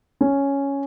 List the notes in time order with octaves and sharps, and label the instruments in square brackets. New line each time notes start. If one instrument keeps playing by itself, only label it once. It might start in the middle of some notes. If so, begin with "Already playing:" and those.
[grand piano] C#4